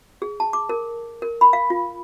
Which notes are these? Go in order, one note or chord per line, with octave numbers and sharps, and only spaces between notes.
G#4
A5
D6
A#4
A#4
B5
F5
F4